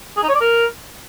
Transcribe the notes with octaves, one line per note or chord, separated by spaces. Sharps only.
G#4
D#4
C#5
D5
A#4